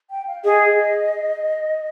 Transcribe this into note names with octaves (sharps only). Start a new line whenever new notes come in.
G5
F5
G#4 D#5